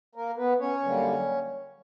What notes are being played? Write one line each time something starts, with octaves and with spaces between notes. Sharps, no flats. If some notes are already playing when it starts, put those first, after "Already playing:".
A#3 A#4
B3 B4
C#4 C#5
F#2 D3 G3 A#3